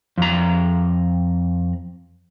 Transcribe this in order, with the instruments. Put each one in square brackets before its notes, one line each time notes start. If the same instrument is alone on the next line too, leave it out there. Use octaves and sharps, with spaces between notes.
[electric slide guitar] F2 A#5